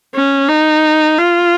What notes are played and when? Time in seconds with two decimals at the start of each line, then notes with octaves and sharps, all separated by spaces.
0.15 C#4
0.50 D#4
1.18 F4